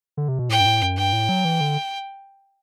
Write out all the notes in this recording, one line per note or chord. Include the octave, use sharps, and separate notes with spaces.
D3
C3
B2
A2 G5
G2
A2
F#2
G2 G5
A2
F#3
E3
D3